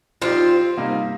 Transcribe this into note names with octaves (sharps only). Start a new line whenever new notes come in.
F3 C4 D#4 F4 G4
C3 G3 A#3 D#4